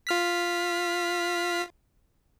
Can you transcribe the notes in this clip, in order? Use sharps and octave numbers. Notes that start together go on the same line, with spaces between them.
F4 F6 B6